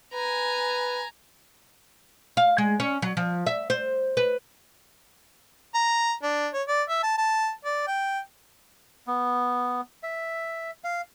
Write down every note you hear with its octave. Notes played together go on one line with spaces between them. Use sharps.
B4 G#5 A#5
F5
G#3
C#4
F#3
F3
E5
C5
B4
A#5
D4
C#5
D5
E5
A5
A5
D5
G5
B3
E5
F5